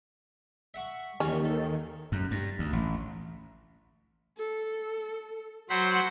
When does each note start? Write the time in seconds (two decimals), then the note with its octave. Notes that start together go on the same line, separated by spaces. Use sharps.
0.74 E5 F#5 C#6
1.20 D#2 D#3 E3 G3 C#4
1.45 A4
2.12 F#2
2.31 G2
2.59 D2
2.73 A1
4.37 A4
5.70 F#3 C5 F#5 B5 C6